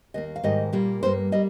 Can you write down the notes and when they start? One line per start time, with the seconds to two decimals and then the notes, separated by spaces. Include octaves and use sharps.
0.14 D#2 D#3 A#3 D#5
0.36 F5
0.43 G#2 D#3 G3 A#3 D#5
0.73 A#2 G3 A#3
1.03 G2 G3 A#3 C5
1.32 G3 A#3 D#5